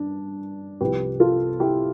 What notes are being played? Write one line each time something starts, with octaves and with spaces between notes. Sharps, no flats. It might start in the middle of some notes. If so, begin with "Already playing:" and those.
Already playing: G2 D4
C2 C3 F3 G4 B4
F4 A4
E4 G4